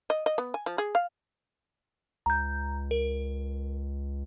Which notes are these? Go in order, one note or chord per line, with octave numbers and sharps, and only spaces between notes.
D#5
D#5
B3
G#5
F3
G#4
F5
C#2 A#5 G6
A#4